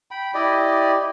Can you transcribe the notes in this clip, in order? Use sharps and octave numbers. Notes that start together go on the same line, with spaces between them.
G5 B5
E4 G4 D5 D#5